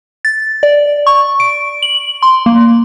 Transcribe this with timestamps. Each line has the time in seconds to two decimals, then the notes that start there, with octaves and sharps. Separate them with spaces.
0.25 A6
0.63 D5
1.07 C#6
1.40 D7
1.83 F#7
2.23 C6
2.46 A#3